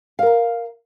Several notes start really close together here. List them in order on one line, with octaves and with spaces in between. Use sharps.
F5 A#4 A#5